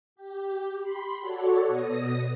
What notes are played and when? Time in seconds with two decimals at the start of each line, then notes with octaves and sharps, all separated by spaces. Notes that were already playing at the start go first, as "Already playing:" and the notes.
0.16 G4
0.80 B5 C6
1.19 F#4 A4 C#5 D5
1.67 B2 D#6 A#6